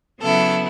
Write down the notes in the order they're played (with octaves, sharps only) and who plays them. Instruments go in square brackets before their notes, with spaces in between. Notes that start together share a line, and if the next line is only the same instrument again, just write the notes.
[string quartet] C#3 F#3 B3 E4 A4